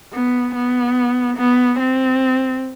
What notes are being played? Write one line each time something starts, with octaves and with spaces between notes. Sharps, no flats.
B3
B3
B3
C4